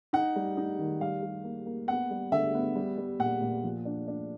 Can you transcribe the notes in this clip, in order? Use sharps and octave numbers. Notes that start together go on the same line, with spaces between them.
D#4 F#5
G3
D#4
D#3
G3 F5
G3
A#3
A#3
B3 F#5
G3
D3 E5
B3
G3
G3
A#2 F#5
A#2
F3
D4
D4